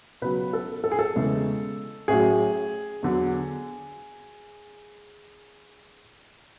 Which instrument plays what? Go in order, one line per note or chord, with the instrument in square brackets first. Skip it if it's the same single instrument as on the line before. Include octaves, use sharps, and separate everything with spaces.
[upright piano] C#2 B2 F#3 B4
A4
A4
G#4
A4
E2 C#3 E3 G#3
A1 A2 F#3 G#4
E2 D3 F#3